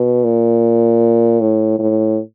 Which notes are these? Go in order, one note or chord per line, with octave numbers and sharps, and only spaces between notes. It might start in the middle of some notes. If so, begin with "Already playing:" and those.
Already playing: B2
A#2
A2
A2